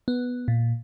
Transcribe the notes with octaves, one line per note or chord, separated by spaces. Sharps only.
B3
A#2